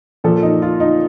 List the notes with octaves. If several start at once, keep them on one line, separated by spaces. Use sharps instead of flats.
A#2 F3 A4
D#4
F4
D#4